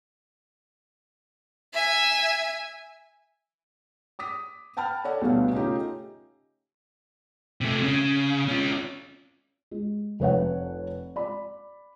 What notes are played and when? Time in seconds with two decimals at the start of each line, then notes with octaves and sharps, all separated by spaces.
1.74 E5 G#5
4.19 D6 D#6 B6
4.77 F#5 G5 A5 B5 F6
5.04 A4 C#5 D5 F#5
5.21 D2 B2 F#3 G3 B3 F5
5.53 C#3 A3 D#4 F4 G4
7.61 C3 A3
7.83 C#3
8.49 C#4 F4
9.71 G#3
10.20 F1 B4 C#5 F#5
11.16 D5 B5